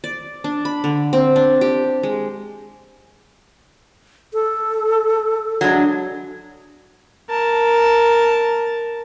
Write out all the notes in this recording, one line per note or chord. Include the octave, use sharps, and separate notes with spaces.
D5
D4
B5
D3
C4
D4
G4
G#3
A4
F#3 G#3 D4
A#4 A5